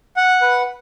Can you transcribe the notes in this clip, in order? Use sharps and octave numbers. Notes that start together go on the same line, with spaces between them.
F#5
B4